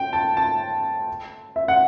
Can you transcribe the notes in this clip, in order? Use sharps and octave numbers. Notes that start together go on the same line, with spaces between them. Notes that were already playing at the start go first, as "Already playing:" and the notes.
Already playing: G5
A5
A5
E5
F#5